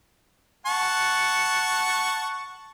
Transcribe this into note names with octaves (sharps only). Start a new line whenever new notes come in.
F#5 A5 C#6